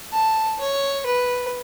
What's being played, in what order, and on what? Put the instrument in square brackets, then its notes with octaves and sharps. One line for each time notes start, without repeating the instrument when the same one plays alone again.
[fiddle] A5
C#5
B4